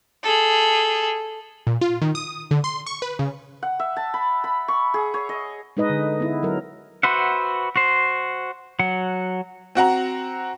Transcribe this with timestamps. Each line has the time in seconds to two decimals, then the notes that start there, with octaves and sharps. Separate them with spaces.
0.23 G#4 A4
1.67 A#2
1.81 F4
2.02 D#3
2.15 D#6
2.51 D3
2.64 C6
2.86 C#6
3.02 B4
3.19 C#3
3.63 F#5
3.79 E5
3.97 A5
4.14 B5
4.44 B5
4.68 C#6
4.94 G#4
5.14 C#5
5.29 D#5
5.77 G#3 D#4 B4 D#5
5.90 D3
6.20 B3 E4
6.43 F#3 A#4
7.03 F#4 B4 C5 E5 F#5
7.76 F#4 C5
8.79 F#3 F#5
9.75 C4 F#4 F#5 A#5